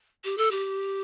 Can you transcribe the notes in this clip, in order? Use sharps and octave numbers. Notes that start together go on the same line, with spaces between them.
G4
A4
G4